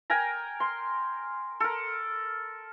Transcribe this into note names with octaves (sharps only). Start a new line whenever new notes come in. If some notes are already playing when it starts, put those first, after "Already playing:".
A#4 G5 G#5 A#5
C6
A4 A#4